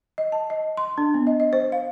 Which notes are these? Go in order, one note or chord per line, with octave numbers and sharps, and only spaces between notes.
D#5
A5
D#5
C6
D4
B3
D#5
D#5
C5
F5